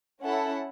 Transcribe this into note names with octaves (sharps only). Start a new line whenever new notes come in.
C#4 E4 A4 F#5 A5